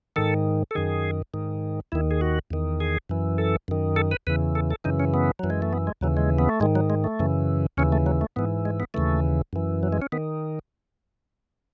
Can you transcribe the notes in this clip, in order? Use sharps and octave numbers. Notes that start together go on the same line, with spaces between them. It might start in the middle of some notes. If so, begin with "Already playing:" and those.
G#2 D#3 A4
A4
F#2 D#3 G#4
G#2 D#3
D#2 D#3 E4
G#4
F#4
E2 D#3
G#4
F#2 E3
A4
F#2 D#3
A4
B4
E2 C#3 E3 B4
A4
A4
F#2 C#3 E3 D#4
C#4
B3
F#2 E3 F#3
G#3
A3
B3
G#3
D#2 C#3 E3 F#3
G#3
B3
A3
G#2 D#3 G#3
F#3
G#3
A3
F#2 C#3 E3
D#2 C#3 E3 C#4
A3
F#3
A3
G#2 E3 B3
G#3
B3
D#2 C#3 E3 A3
F#2 E3
F#3
G#3
C#4
D#3 B3